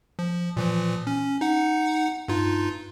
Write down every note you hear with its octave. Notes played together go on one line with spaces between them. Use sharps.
F3
A#2 E3 F3
C#4
D#4 F#5
G2 D#4 F4